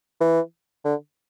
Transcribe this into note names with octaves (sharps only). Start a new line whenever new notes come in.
E3
D3